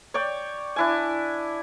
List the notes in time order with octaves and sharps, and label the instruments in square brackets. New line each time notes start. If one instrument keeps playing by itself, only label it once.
[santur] C#5 D5 G5
D4 E4 G#5